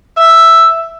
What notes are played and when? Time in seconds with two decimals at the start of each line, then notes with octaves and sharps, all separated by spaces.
0.17 E5